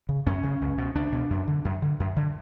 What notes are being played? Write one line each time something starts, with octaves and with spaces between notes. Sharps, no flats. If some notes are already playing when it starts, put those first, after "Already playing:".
C#3
F#2 C#4
C#3
C#2
B2
C#2 D4
B2
F#2
D3
F#2
D3
F#2
D3